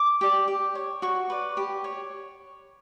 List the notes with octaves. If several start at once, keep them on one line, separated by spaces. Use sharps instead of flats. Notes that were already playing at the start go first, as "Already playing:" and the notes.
Already playing: D6
G4 D5
G4
C#5
F#4 C#6
B4 D5
G4
C#5